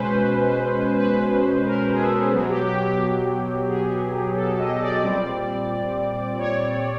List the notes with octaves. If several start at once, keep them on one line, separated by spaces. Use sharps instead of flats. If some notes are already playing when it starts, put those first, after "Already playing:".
Already playing: B2 G#3 C#4 B4 C5
B4
A#4
G#4
A4
B2 F#3 B3 G#4
G4
G4
G4
G#4
A4
D#5
D5
A#2 G3 C4
C#5